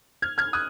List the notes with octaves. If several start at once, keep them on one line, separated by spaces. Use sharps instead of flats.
F6 G#6
F6 G#6
D#6 F#6